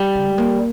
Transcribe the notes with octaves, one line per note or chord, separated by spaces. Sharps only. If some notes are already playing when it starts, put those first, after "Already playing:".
Already playing: G3
C#3
G#3
A#3